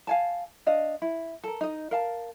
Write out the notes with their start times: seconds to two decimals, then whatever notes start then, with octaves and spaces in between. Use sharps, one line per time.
0.07 F5 G#5 A5
0.66 D4 D#5 F5
1.02 E4
1.44 A4 A#4
1.61 D#4 D#5
1.91 A#4 F5 A5